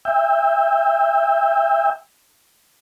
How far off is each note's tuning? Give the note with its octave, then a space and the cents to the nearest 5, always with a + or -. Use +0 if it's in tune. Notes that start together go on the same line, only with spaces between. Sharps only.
E5 +0 G5 +25